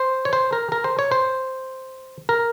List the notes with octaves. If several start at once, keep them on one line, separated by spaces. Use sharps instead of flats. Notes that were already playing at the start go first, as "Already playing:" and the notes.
Already playing: C5
C#5
C5
A#4
A#4
C5
C#5
C5
A#4